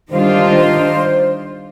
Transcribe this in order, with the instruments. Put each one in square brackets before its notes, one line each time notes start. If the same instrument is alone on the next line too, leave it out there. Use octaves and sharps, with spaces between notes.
[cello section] D#3 G3 D4 F4 [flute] C5
[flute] C5